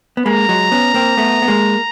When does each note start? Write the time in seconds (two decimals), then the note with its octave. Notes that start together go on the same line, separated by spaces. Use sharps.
0.17 B3
0.26 G#3 A#3 A#5
0.49 F#3 G#3
0.72 B3 C#4
0.94 A#3 C4
1.17 A3 B3
1.42 B3
1.48 G#3 A#3